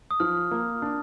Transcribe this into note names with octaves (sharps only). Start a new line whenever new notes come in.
D#6
F3 F6
A#3
D4